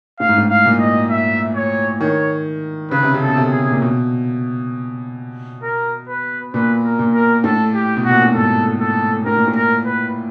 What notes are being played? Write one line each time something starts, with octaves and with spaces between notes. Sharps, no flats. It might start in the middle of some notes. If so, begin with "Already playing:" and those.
A2 F5
G#2
A2
F5
A#2
D#5
E5
C#5
D#3 C#5
C#3 B4
C3
C#3
A4
B2
C3
G#4
A#2
B2
A#4
B4
A#2 B4
A#4
A#2
A#4
A2 A4
G4
B2
A#2 F#4
A2
G#2 A4
A4
A2 A#4
A#2
A2
A#4
B4